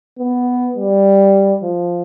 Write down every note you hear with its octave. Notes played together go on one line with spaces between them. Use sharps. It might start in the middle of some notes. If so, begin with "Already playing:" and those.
B3
G3
F3